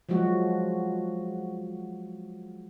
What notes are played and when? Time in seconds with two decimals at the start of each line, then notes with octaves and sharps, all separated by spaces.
0.09 F3 F#3 G#3 F#4